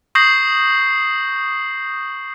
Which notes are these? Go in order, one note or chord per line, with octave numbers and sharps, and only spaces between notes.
C#6 D#6 G6 A#6 C7 F#7